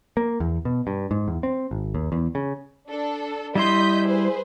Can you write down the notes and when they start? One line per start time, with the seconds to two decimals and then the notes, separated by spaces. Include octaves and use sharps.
0.17 A#3
0.40 E2
0.65 B2
0.87 G2
1.11 G#2
1.28 E2
1.43 C4
1.71 G#1
1.95 D#2
2.12 E2
2.35 C#3
2.88 D4 A4
3.55 G3 E4 D#5 C6 G6 B6
4.05 G#4 B4 C5